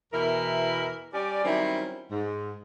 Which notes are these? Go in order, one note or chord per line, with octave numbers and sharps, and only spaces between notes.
E2 B2 E3 E4 A#4
G3 C#4 G4 D5
D#3 F#3 G3 C4 C#4 E4
G#2